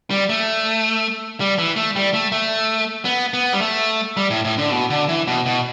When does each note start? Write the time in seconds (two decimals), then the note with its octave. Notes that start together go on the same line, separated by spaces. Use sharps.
0.11 G3
0.29 A3
1.40 G3
1.59 E3
1.76 A3
1.96 G3
2.14 A3
2.32 A3
3.05 B3
3.34 B3
3.53 G3
3.61 A3
4.17 G3
4.30 A2
4.44 A2
4.58 D3
4.71 B2
4.90 D3
5.08 E3
5.27 B2
5.46 B2